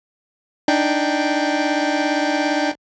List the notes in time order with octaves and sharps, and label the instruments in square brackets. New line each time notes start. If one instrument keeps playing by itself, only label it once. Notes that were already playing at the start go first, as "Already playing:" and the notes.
[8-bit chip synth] D4 D#4 G5